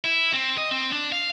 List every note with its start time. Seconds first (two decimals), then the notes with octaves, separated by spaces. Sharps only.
0.04 E4
0.33 C4
0.58 D#5
0.71 C4
0.93 D4
1.12 F5